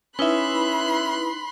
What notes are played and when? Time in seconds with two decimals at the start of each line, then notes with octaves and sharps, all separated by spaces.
0.19 C#4 D#4 E4 B4 E5 B5 C6 F#6